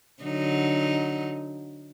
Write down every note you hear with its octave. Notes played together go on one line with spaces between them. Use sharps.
D3 F#3 D#4